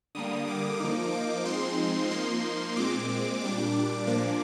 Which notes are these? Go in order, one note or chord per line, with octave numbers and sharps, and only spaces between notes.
D3 G3 A#3 D#6
D6
F3 A#3 D#4
D6
F3 G#3 C4 D#4 C6
F3 A#3 D#4 C6
A#2 G#3 C4 D6
A#2 G3 D4 D6
A#2 F3 A#3 D4 D6